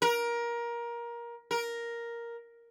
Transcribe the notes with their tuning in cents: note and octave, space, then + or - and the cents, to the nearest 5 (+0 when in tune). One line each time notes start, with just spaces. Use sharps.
A#4 +20
A#4 +5